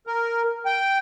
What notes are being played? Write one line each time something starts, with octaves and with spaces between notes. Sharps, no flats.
A#4
G5